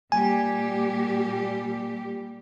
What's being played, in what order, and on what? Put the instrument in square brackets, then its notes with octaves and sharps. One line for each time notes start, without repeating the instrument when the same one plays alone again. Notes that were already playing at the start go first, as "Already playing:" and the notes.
[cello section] A#2 G3 G4 [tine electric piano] G#5